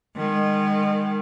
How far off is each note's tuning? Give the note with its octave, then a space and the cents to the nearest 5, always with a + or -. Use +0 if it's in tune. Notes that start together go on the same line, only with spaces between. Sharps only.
D#3 -30 G#3 -35